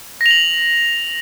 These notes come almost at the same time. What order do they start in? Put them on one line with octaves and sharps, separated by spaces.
A#6 F7 F#7